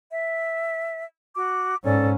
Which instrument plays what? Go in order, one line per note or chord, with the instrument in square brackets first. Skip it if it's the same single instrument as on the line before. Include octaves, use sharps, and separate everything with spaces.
[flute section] E5
F#4 D6
[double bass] G#2 C#4 [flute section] A4 D5